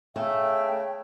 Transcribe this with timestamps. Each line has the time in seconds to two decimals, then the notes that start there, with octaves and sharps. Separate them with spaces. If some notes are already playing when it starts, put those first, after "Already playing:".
0.16 C#3 A3 E5 G5